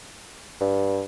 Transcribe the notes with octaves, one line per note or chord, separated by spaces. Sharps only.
G2